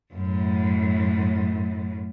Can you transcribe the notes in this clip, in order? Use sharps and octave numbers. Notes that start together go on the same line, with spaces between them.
F#2 A2